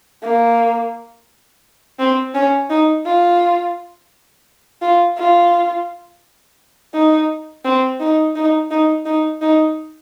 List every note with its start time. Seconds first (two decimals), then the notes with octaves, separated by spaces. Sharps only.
0.23 A#3
1.99 C4
2.34 C#4
2.70 D#4
3.06 F4
4.81 F4
5.18 F4
6.94 D#4
7.65 C4
8.00 D#4
8.35 D#4
8.71 D#4
9.06 D#4
9.41 D#4